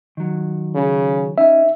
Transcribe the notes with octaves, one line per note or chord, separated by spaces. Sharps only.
D#3 F#3
C#3
C#4 D#4 E5